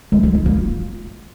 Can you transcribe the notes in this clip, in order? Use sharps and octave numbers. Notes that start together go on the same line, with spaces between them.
G#3
G#3
D#4
A#3
F4